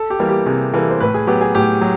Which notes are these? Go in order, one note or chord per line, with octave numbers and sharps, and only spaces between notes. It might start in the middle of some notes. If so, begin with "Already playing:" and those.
Already playing: A4
G4
E3 G3 A#3
G4
C3 G#4
E3 G3 A#3 A4
C5
A2 B4
G#4
F#3 B3 G4
G#4
A2 G4
F#3